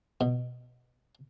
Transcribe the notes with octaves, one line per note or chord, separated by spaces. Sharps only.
B2